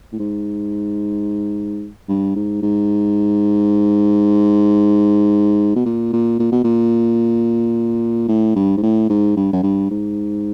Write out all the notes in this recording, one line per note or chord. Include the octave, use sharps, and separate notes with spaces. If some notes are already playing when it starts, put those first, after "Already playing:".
A2
G#2
G2
G#2
G#2
B2
A#2
A#2
A#2
B2
A#2
A2
G2
G#2
A2
G#2
G2
F#2
G2
G#2